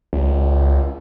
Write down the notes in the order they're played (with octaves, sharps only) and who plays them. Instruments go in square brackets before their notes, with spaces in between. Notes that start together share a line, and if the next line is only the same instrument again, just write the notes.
[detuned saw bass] C#2